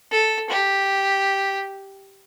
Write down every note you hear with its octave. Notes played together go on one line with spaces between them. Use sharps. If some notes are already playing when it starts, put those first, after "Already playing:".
A4
G4